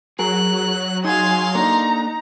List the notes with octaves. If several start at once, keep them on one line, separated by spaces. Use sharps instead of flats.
F#3 G#4 A#4 F#6
D#4 G#4 F5 G#5 C6
A#3 D4 D#4 A4 A#5